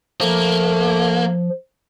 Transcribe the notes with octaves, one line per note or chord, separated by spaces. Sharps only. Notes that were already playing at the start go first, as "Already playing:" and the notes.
F3 A3 A#3